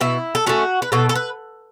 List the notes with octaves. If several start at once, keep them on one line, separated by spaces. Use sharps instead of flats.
B2 E4
A4
A3 C#4 F#4
B4
B2 A4
A4
B4